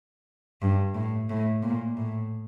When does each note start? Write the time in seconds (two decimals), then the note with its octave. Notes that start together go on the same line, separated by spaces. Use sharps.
0.62 G2
0.95 A2
1.30 A2
1.63 A#2
1.97 A2